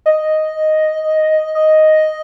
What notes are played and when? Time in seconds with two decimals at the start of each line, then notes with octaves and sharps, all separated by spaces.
0.06 D#5
1.55 D#5